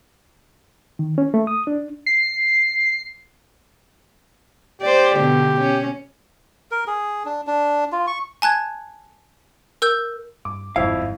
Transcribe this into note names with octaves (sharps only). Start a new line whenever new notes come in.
D#3
C#4
A3
D#6
D4
C7
G4 C5 D5
B2 D3
C#4
A#4
G#4
D4
D4
F4
C#6
G#5 A5 F#6 G#6
A#4 E6 G6
G2 D6
G1 F2 G#2 E4 F5